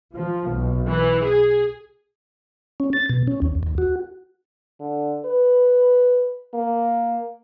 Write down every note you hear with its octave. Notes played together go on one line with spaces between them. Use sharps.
F3
B1
E3
G#4
C#4
A6
B2
C#4
D#2
D#2
F#4
D3
B4
A#3